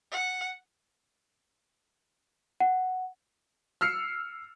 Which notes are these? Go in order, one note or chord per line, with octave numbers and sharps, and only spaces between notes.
F#5
F#5
E6 F6 C7 C#7